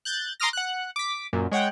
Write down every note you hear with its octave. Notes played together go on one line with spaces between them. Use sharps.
F#6 G6 A6
A#5 C6 D6 D#6 F6 A#6
F#5 F#6
D6 B6
F#2 A#2
G#3 C#5 F#5 G5